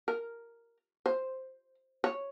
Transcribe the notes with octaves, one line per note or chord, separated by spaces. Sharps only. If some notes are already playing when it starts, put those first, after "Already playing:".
A#4
C5
C#5